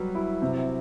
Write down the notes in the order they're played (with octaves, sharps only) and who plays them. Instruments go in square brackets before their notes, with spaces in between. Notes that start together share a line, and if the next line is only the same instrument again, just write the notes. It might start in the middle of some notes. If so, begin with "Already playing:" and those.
Already playing: [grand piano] F#3 G3 B4
E4
C3